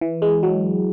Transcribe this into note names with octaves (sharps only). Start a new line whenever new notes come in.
E3
G#3
F#3